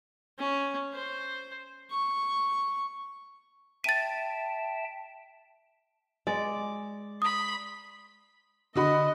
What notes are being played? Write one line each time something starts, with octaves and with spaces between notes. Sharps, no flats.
C#4
C5
C#6
E5 G5 A5 A6 D#7
G#3 D5
B5 C6 D#6
D3 F#4 D#5 B5